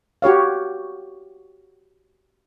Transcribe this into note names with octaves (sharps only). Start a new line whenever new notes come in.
F#4 G4 C#5 F5